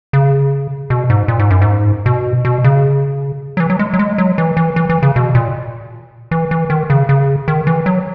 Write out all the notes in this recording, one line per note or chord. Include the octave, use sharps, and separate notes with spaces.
C#3
B2
G#2
A#2
G#2
F#2
G#2
B2
B2
C#3
F#3
E3
F#3
G#3
F#3
G#3
F#3
E3
E3
E3
E3
C#3
B2
A#2
E3
E3
D#3
C#3
C#3
D#3
E3
F#3